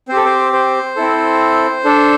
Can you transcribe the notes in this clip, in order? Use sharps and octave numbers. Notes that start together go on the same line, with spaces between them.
C4 G4 A4 C5
C5
C5
C4 E4 A4
D4 A4